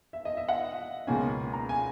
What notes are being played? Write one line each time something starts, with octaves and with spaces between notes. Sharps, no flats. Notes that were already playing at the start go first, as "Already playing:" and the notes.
E5
D#5
E5
F#5
C#2 B2 A#3 C#4 G#5
A#5
G#5